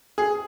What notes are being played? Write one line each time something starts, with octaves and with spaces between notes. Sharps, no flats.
G#4